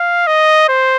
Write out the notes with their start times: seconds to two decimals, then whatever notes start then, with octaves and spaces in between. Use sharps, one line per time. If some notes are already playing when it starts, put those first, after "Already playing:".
Already playing: F5
0.27 D#5
0.68 C5